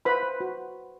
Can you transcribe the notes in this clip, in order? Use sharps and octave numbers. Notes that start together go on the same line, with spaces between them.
B4 C5 B5
C5
F#4